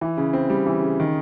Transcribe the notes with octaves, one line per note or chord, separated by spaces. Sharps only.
E3
C#3
C4
G3
E3
C#3
D#3